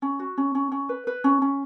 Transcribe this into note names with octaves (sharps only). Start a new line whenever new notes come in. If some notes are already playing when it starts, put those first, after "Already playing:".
C#4
F#4
C#4
C#4
C#4
B4
B4
C#4
C#4